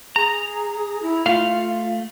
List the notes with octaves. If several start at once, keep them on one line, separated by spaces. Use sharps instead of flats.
G#4 A#5
E4
A3 F4 F5